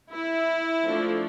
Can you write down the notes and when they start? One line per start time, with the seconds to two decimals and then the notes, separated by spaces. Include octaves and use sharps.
0.12 E4
0.83 F3 A3 D4